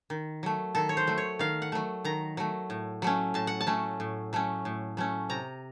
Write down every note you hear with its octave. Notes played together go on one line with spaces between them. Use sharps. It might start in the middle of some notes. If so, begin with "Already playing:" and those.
D#3
F#3 A3
D#3 A4
C#5
C5
F#3 A3
C#5
D#3 F5
F#5
F#3 A3
D#3 A#5
F#3 A3
A2
F#3 A3 C#4
A2 A5
F#5
A5
F#3 A3 C#4
A2
F#3 A3 C#4
A2
F#3 A3 C#4
C3 A#5